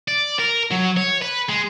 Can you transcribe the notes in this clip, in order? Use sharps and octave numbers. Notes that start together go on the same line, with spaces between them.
D5
A#4
F#3
C#5
B4
G#3